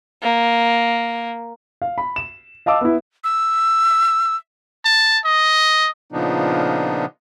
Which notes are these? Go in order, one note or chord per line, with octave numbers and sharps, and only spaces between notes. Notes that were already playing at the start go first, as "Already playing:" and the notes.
A#3
F5
B5
E7
D#5 F5 A5 D6 E6
B3 E4
E6
A5
D#5
A#2 C#3 F3 B3 D4 D#4